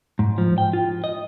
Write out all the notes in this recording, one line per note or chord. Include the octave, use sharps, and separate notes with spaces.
G#2
F3
G5
F4
D#5